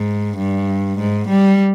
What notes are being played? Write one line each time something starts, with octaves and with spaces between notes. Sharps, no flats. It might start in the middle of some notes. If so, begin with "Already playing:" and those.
Already playing: G#2
G2
G#2
G3